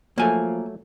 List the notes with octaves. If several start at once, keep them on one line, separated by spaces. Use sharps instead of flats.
F3 F#3 A3 A#3 G#5